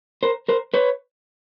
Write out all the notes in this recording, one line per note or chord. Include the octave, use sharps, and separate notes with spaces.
A#4 C5
A#4 C5
B4 C#5